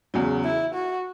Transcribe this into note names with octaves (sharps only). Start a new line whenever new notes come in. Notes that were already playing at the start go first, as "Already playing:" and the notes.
E2 C#3 F#3
E4
F#4